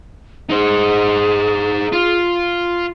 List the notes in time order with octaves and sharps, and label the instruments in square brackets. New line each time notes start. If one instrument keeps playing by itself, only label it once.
[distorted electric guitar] D#4 C5 [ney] G#4
[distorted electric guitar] F4